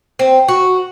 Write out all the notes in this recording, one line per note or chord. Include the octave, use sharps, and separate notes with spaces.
C4
F#4